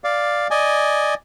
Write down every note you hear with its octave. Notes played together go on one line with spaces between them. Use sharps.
D5 F5
D5 D#5 G#5